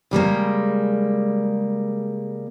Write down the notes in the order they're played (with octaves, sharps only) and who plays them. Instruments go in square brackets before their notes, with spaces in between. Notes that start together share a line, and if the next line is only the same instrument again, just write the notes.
[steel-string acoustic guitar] C#3 G3 G#3 A#3